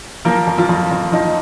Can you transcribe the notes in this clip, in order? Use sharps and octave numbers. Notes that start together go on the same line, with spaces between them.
F3 A#3 A#4
F2
F3 F4
F2
F2
F3 D#4